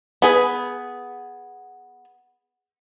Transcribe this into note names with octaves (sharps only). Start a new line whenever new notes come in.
B3 G#4 B4